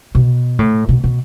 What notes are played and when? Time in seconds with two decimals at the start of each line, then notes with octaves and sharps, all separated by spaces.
0.15 B2
0.59 A2
0.89 B2
1.04 B2